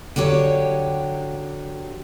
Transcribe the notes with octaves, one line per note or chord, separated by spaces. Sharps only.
D3 F#3 G4 C#5